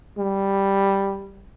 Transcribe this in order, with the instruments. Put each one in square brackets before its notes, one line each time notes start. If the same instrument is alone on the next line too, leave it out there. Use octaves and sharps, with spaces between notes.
[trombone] G3